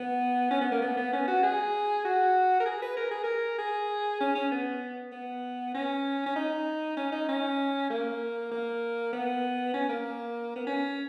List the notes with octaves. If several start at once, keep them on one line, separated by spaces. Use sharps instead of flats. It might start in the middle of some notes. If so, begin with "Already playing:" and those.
Already playing: B3
C#4
B3
A#3
B3
B3
C#4
F#4
G#4
F#4
A#4
G#4
B4
A#4
G#4
A#4
G#4
C#4
C#4
B3
B3
C#4
C#4
D#4
C#4
D#4
C#4
A#3
A#3
B3
C#4
A#3
B3
C#4